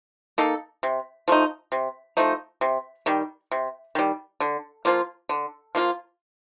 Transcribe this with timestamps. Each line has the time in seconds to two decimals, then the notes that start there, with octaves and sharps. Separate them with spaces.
0.38 A#3 D#4 A4
0.83 C3
1.28 F3 A3 D#4
1.72 C3
2.17 F3 A3 D#4
2.61 C3
3.06 D#3 G3
3.52 C3
3.95 D#3 G3
4.40 D3
4.85 F3 A#3 F4
5.29 D3
5.75 F3 A#3 F4